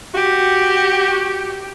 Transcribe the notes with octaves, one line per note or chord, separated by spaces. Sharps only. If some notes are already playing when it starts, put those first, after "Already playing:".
F#4 G4